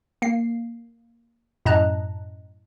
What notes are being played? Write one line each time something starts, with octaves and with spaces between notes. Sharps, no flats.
A#3 C7
F#2 A2 D#5 A5 A#5 F#6